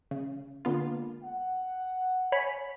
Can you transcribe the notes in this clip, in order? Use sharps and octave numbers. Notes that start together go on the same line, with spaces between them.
C#3
D3 G#3 A#3 B3 F4
F#5
C#5 G#5 B5